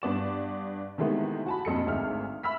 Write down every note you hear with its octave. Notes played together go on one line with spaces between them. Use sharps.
G2 B3 D5 E7
C3 D#3 E3 G#3 A3 B3
F#4 A5 B5
A#1 F2 A4 C#7
G#1 D2 G#4 E5 F6
E5 B5 E6 F6 B6